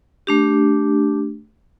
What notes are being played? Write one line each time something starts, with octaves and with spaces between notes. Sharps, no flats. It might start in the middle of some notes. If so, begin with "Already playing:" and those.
A3 D4 G4